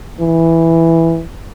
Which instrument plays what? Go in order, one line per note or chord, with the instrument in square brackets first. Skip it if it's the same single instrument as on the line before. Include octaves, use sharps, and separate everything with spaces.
[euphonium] E3